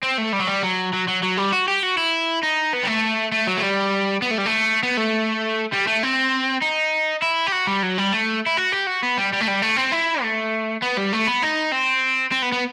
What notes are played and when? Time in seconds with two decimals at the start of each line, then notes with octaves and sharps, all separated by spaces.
0.03 C4
0.18 A3
0.33 G3
0.40 F#3
0.47 G3
0.63 F#3
0.93 F#3
1.08 F#3
1.22 F#3
1.37 G3
1.52 F#4
1.68 G4
1.83 F#4
1.97 E4
2.43 D#4
2.73 B3
2.83 G3
2.87 A3
3.32 A3
3.47 F#3
3.57 A3
3.62 G3
4.22 B3
4.31 A3
4.38 G3
4.46 A3
4.83 B3
4.97 A3
5.72 G3
5.87 A3
6.03 C4
6.62 D#4
7.22 E4
7.47 G4
7.52 F#4
7.67 G3
7.83 F#3
7.98 G3
8.12 A3
8.46 E4
8.57 F#4
8.72 G4
8.87 F#4
9.03 B3
9.17 G3
9.32 G3
9.40 A3
9.47 G3
9.62 A3
9.77 C4
9.92 E4
10.23 A3
10.83 B3
10.98 G3
11.13 A3
11.27 B3
11.42 D#4
11.72 C4
12.32 C4
12.42 B3
12.52 B3